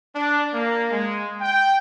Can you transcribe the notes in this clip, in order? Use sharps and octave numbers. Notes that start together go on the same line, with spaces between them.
D4
A#3
G#3
G5